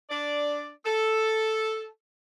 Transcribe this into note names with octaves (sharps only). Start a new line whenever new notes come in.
D4 D5
A4